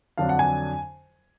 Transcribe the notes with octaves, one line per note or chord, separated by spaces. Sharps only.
F2 D3 F#3 D4 F5
F#5
G#5